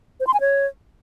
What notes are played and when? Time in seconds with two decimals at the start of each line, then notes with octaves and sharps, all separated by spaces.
0.20 C5
0.27 C6
0.34 G#5
0.41 C#5